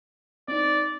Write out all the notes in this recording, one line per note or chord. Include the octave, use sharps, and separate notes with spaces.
C4 D#4 D5